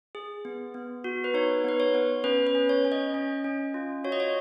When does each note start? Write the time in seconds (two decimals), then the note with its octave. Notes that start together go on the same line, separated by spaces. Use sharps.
0.15 G#4
0.45 B3
0.74 B3
1.04 F#4
1.24 B4
1.34 D#4 C#5
1.64 B3 B4
1.80 C#5
1.94 B3
2.24 C#4 B4
2.47 B4
2.55 C#4
2.69 C#5
2.85 C#4
2.92 D#5
3.14 C#4
3.44 C#4
3.74 F4
4.04 F#4 C#5
4.12 D#5
4.20 C#5